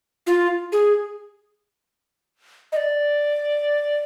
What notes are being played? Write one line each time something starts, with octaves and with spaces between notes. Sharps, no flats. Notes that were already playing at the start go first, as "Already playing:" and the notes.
F4
G#4
D#5
D5